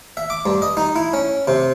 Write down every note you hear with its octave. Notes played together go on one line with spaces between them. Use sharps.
E5
D6
G2
D#5
D#4
E4
C#4
C3